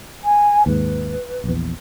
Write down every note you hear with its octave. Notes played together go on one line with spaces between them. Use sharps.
G#5
D#2 G#2 B4
A#1 E2